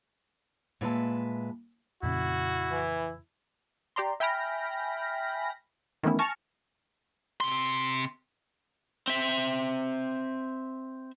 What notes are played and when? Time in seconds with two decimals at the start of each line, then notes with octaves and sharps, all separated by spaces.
0.81 A#2 G#3 B4 E5 A5
2.03 F2 A#2 C#3 E4 F#4
2.71 E3
3.96 G4 D5 A#5 C6
4.20 E5 G5 G#5 B5 F6 A#6
6.03 D#3 E3 A3 B3 C#4 E4
6.19 G#5 A5 C#6 F6 A#6
7.41 C3 C6
9.07 C4 E5